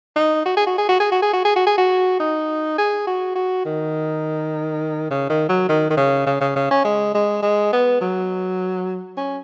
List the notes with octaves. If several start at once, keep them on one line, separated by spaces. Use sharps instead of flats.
D#4
F#4
G#4
F#4
G#4
F#4
G#4
F#4
G#4
F#4
G#4
F#4
G#4
F#4
D#4
G#4
F#4
F#4
D#3
C#3
D#3
F#3
D#3
D#3
C#3
C#3
C#3
C#3
C#4
G#3
G#3
G#3
B3
F#3
C#4